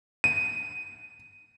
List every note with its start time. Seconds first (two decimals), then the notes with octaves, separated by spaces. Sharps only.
0.24 D#7